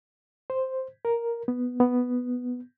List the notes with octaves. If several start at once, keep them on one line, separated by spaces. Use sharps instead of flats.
C5
A#4
B3
B3